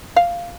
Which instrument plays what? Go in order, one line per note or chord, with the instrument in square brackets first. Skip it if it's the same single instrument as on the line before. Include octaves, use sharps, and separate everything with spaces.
[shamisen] F5